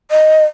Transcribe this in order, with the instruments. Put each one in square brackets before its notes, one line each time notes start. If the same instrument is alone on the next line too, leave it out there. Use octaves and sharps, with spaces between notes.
[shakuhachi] D#5